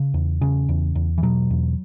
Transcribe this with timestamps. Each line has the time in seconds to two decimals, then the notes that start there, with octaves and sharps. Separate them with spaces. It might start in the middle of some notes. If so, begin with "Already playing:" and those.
Already playing: C#3
0.14 E2
0.41 C#3
0.69 E2
0.95 E2
1.18 E3
1.23 B2 F#3
1.50 E2